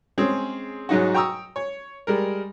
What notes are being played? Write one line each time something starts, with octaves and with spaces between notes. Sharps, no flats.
G#3 C4 C#4 G#4
G#2 F#3 D#4 F#4
G5 A#5 C#6 D#6 E6
C#5
G3 G#3 A#4